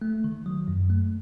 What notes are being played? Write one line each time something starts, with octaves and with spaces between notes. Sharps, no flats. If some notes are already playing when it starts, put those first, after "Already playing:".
A3
D#3
F#3
F#2
A3